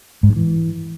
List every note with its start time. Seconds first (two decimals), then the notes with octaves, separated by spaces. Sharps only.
0.23 G#2
0.30 G2
0.36 E3